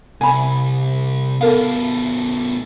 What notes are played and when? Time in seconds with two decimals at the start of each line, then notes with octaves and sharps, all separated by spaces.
0.21 C2 G#5 B5
1.41 A2 B3 A4 A#4 F5